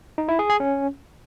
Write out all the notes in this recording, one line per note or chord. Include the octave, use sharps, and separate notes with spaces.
D#4
E4
G#4
G#4
C#4